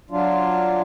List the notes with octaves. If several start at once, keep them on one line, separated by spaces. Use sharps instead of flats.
F#3 D4 F4